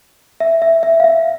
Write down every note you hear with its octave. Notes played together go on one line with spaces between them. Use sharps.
E5
E5
E5
F5
E5